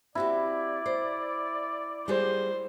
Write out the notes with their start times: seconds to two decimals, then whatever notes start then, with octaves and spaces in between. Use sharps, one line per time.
0.15 C4 E4 F#4 G4 D5
0.86 C5
2.08 G3 F#4 G#4 C5